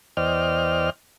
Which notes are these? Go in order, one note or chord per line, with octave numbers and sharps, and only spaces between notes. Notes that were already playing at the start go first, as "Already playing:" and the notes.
E2 C5 D5 D#5 G5 F6